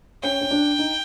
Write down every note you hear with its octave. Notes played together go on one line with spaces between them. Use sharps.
C#4 G5
C#4
D4
D#4